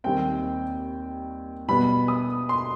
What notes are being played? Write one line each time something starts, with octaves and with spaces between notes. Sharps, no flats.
D#2 D#3 G3 C4 G5
B2 G3 B3 B5
D#6
C6